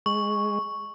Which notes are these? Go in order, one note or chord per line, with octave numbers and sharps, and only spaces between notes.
G#3 C#6